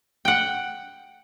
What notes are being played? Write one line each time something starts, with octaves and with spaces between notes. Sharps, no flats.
F#5 G5